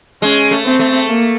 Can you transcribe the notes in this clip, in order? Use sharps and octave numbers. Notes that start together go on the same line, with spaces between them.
G#3 C#4
A3
C4
A3
A#3